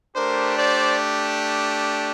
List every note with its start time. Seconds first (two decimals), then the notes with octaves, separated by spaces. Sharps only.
0.15 A3 D4 G4 A#4 C5
0.57 C5 D5